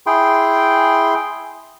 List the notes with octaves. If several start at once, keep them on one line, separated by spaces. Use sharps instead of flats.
E4 G#4 G5 C6